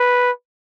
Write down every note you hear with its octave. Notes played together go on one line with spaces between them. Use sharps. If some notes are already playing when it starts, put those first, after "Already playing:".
Already playing: B4